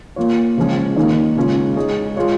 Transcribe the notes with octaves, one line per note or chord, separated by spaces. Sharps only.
A#3 F4 C#5
C#3 F3 G#3 C#4
D#3 A#3 D#4 C#5
C#3 G#3 C#4 F4
G#3 D#4 G#4 C#5
G#3 F4 C#5